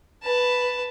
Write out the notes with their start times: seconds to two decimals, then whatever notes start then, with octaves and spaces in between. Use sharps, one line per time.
0.23 B4 A5